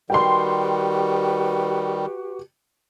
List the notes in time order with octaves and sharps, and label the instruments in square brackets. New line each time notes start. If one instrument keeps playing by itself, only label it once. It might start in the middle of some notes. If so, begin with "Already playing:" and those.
[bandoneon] D#3 G3 [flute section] F#4 G4 B4 [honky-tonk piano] G5 C6